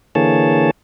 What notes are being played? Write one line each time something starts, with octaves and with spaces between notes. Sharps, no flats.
D3 E3 A#3 G#4 C#5 A5